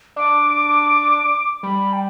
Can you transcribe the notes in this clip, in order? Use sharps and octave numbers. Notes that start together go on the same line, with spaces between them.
D4 D6
G3 B5
G5